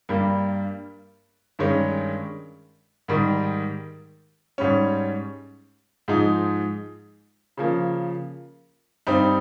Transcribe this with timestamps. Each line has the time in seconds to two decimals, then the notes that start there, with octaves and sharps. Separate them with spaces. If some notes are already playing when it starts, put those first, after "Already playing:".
0.09 G2 G3 A#3
1.59 G2 D#3 G#3 C#4
3.08 G#2 D#3 G3
4.58 G#2 G3 C#4
6.08 G#2 F3 G#3 D#4
7.57 C#3 F3 A#3
9.07 G2 G3 C4 D#4